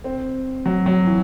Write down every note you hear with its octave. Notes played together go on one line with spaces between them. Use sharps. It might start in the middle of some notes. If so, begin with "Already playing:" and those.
C4
F#3
F#3
E3